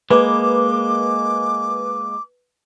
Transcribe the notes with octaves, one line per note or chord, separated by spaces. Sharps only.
G#3 A#3 B4 D6